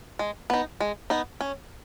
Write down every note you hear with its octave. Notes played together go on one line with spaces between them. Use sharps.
G#3
B3 D#4
G#3
B3 D#4
C#4